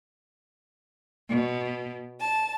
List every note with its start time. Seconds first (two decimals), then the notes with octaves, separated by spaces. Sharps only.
1.28 B2
2.20 A5